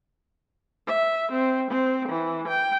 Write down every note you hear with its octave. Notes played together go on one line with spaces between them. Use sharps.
E5
C4
C4
E3
G5